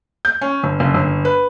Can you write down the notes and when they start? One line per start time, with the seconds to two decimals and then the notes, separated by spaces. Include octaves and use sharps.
0.25 G6
0.41 C#4
0.64 G1
0.80 F#1
0.94 G1
1.25 B4